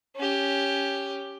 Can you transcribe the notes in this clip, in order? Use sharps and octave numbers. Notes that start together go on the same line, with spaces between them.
C#4 G4